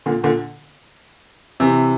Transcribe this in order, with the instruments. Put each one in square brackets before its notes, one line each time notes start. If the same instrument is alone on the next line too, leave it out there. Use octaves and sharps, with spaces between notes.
[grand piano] A#2 D3
A#2 D3
C3 E3